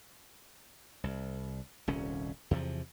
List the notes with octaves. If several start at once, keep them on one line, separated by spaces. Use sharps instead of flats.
C2
D#1 C2 C#4
E2 C3 E3 F3